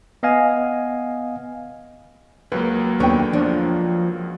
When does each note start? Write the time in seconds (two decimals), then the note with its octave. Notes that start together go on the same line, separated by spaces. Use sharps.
0.23 B3 D#5 F5 G#5
2.52 C#2 F#3 A#3 B4
3.00 D#2 D3 B3 B4 C#5 G5
3.33 F3 D4